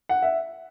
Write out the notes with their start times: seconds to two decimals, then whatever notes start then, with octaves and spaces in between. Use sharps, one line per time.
0.09 F#5
0.22 E5